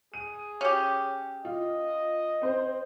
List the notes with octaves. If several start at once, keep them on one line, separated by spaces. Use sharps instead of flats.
G#4 D#7
C#4 G4
F4 D#5
C4 C5